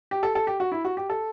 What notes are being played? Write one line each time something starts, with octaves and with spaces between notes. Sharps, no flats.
G4
A4
A4
G4
F#4
E4
F#4
G4
A4